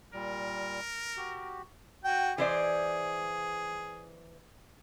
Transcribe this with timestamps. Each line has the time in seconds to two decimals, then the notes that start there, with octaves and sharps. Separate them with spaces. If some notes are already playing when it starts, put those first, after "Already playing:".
0.14 A#2 G3 A#4
1.17 F#4 G4
2.05 F#4 G5
2.38 E3 G#4 C5 D5